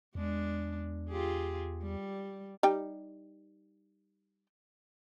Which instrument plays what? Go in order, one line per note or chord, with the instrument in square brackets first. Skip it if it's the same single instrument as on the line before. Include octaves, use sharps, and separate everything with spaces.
[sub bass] E2 [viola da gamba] G#3 D4
[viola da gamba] F4 G4 G#4
G3
[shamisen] G3 D#4 G5